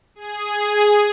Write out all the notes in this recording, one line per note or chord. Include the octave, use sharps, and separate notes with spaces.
G#4